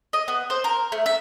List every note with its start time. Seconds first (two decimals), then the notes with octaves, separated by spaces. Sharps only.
0.13 D#5
0.28 B3
0.50 C5
0.64 A#4
0.92 A3
1.06 E5